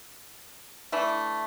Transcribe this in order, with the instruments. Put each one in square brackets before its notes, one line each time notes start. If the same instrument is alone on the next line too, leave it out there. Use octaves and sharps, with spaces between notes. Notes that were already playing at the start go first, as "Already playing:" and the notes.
[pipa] E3 A3 D4